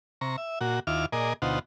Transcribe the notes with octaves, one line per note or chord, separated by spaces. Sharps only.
C3 A#5 C#6
E5
A#2 F#4
D#2 E4 F4 D6 F6
A#2 G#4 A#4 D5 D#5
D2 B2 D#4 F4 C5 F#5